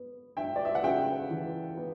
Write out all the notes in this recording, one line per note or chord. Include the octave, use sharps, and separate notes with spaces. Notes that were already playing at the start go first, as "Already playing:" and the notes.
Already playing: B3
D4 E5 G5
D5
E5
F#5
C#3 E5 G5
E3
B3